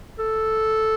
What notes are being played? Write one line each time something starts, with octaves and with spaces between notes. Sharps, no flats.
A4